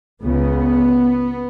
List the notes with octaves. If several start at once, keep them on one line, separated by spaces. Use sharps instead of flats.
C#2 C#3 B3